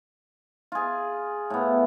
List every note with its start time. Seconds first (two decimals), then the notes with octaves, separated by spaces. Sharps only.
0.72 F4 G#4
1.50 A2 B3